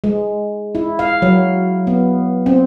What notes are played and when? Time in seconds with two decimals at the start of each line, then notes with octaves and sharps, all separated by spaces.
0.04 G#3
0.75 E4
0.99 F5
1.22 F#3
1.87 B3
2.46 C4